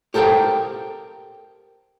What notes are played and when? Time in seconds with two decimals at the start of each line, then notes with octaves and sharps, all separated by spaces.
0.14 G4 A4 A#4 C5 G5